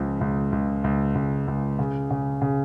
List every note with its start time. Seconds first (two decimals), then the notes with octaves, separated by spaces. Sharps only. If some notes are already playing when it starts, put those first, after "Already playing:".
Already playing: C#2 C#3 F3
0.21 C#2
0.52 C#2
0.84 C#2
1.15 C#2
1.48 C#2
1.79 C#3
2.11 C#3
2.42 C#3